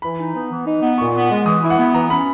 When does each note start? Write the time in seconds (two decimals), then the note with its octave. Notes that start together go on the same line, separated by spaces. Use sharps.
0.02 E3 B5
0.18 D#4
0.35 B3
0.50 E3
0.66 D#4
0.82 B3
0.98 A#2 C#6
1.14 B3
1.30 G#3
1.46 E3 D#6
1.62 E4
1.70 F#5
1.78 B3
1.94 E3 A#5
2.10 C#4 B5